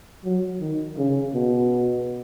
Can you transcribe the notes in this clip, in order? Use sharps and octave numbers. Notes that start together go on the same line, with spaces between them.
F#3
D#3
C#3
B2